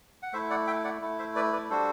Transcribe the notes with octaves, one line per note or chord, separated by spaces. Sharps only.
F#5
A3 E4 C5 E5
D5 F#5
E5 G5
D5 F#5
A3 E4
C5 E5
B4 D5
B4 D5
G3 D4 F#4 A4 C5